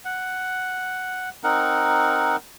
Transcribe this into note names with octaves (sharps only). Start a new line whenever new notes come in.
F#5
C4 D#4 A#4 F#5